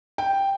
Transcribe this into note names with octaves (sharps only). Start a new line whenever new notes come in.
G5